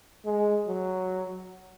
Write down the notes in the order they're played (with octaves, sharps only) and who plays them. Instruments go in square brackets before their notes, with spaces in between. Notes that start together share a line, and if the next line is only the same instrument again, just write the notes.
[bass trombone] G#3
F#3